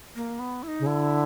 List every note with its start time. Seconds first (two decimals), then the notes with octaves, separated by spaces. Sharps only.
0.16 A#3
0.39 B3
0.63 E4
0.68 D#4
0.79 C#3
0.86 D3 E4